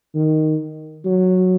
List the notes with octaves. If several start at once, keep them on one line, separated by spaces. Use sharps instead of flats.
D#3
F#3